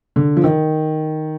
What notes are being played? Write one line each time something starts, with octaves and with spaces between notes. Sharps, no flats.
D3
F3
D#3